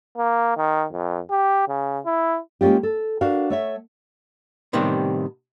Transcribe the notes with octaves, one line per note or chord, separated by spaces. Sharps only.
A#3
D#3
F2
G4
C#3
E4
G#3 A#3 C#4 F4 G4
A4
D4 F#4 A#4 F5
A3 C#5 E5
A2 C3 D#3 G3 B3 C4